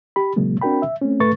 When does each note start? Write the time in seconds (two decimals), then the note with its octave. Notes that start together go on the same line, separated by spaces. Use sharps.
0.16 G4 B5
0.36 A#2 C#3 F#3 G#3 A#3
0.62 C4 D4 F#4 A#4 G5 B5
0.82 E5
1.02 A3 C4 C#4
1.20 G#2 A3 B4 C#6 A6